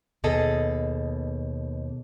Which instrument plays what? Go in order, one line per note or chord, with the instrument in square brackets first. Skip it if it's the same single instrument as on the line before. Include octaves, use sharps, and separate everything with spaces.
[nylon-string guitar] D#2 B2 G#4 A4 D#5